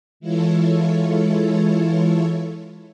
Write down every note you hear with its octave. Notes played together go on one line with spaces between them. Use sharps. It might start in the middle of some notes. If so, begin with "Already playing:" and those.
E3 G#3 E4 F4 A4 C#5